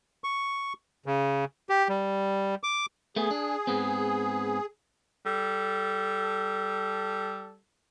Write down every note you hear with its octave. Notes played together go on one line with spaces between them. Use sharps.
C#6
C#3
G4
G3
D6
A3 B3 G#4
D4
G#2 B3 C4
G3 A4